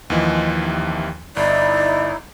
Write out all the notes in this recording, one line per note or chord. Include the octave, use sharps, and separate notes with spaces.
D#2 E3 F3 G#3
C3 D#3
G1 D#4 E4 D5